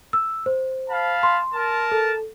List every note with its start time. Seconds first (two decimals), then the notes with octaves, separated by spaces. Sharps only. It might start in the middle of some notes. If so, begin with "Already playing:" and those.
0.13 E6
0.46 C5
0.89 F5 A5 B5
1.23 C6
1.53 A#4 A5
1.92 A4